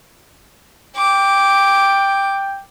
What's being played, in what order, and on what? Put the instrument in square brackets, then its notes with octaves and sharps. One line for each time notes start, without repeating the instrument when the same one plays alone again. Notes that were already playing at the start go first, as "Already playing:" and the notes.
[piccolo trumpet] G5 [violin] D6